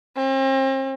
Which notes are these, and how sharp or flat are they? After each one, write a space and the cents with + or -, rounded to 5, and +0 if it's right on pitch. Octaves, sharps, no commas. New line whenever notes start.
C4 +40